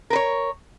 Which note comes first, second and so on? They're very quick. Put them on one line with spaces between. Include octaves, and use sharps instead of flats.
A#4 B4 C#5